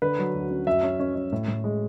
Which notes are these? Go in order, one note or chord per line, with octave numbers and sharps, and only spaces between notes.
D3 B4
F#3
D2
C#4
F#2 E5
C#4
C#4
C#4
A2
A2
G#3